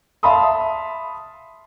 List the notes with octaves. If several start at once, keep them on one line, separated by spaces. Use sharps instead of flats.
E5 F5 A5 B5 C6 D#6